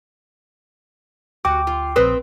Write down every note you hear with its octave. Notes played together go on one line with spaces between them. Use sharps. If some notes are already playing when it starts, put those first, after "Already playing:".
D2 F#4 G5 D6
F4
A#1 C4 B4 C5 D#6